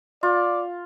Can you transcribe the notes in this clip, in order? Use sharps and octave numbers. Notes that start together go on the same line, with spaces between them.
F4 D5